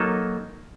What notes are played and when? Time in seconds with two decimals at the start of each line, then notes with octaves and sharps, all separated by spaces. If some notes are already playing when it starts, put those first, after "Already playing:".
Already playing: F#3 A#3 D#4 A4